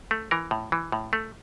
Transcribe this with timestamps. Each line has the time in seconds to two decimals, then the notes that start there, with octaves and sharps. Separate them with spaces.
0.11 A3
0.31 E3 A#4
0.51 A2
0.72 E3
0.92 A2
1.13 A3